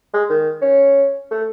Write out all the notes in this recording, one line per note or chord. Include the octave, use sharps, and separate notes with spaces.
G#3
D#3
C#4
A3